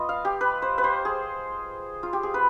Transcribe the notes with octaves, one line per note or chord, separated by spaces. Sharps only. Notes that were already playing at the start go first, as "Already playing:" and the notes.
Already playing: B3 F4 D#5
F5
G4
B4
C5
B4
C5
G#4
F4
G4
G#4
B3 B4